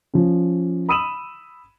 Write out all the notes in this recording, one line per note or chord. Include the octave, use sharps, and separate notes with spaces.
F3 C#4
B5 D#6 E6 D#7 E7 F#7